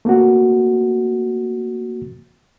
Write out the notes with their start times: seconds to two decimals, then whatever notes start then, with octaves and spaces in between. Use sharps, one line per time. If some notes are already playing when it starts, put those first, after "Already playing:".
0.05 A3 A#3 C4 F#4